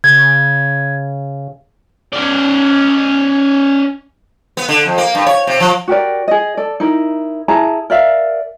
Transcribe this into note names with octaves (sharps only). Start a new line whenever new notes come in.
C#3 G#6
C#4 D5
B3
D3
F2
A#3
G2
C#5
C3
F3
F#4 G4 A#4 D5
G#4 D#5
A4 D5
D#4 E4 A#4
E4 G#4 A5 A#5
A#4 D5 E5 F5